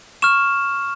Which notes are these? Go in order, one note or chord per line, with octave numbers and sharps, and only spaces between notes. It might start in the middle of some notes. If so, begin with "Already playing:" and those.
C#6 F6 E7